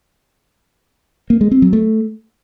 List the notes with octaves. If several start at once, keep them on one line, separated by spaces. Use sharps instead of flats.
A#3
G#3
C4
F#3
A3